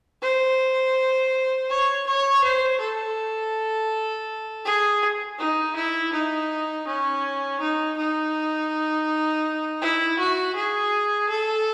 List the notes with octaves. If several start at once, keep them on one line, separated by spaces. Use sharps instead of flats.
C5
C#5
C#5
C5
A4
G#4
D#4
E4
D#4
C#4
D#4
D#4
E4
F#4
G#4
A4